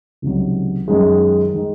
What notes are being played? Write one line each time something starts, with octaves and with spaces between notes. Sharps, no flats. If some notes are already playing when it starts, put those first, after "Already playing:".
C#2 C3 D#3 F#3
F#2 D#3 G#3
D#3 G#3